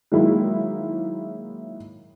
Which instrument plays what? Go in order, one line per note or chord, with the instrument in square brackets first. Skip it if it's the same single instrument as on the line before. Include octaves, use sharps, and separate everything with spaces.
[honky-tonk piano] D#3 F#3 G#3 A#3 E4